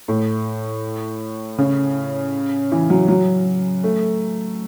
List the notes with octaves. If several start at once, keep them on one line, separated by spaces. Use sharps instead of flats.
A2
C#3
E3
F#3
F#3
A3